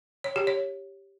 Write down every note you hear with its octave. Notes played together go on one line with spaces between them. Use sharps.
C#5
G4
C#5